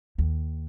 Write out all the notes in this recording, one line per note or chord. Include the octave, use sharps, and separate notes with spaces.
D#2